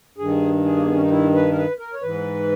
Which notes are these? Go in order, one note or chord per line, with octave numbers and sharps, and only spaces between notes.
G2 D#3 G#4
G#4
A#3
B3
C#4
D#4
E4
B4
A#4
B4
A#4
C#5
G#2 E3 B4